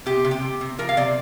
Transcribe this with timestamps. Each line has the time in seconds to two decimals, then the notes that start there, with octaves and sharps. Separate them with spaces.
0.06 C3 G4
0.25 C3
0.31 G4
0.42 C3
0.61 C3
0.78 F3 A#4
0.89 F5
0.97 C3 D5